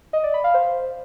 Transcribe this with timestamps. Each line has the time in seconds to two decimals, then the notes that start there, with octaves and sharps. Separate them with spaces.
0.13 D#5
0.23 D5
0.34 B5
0.44 F5
0.54 C5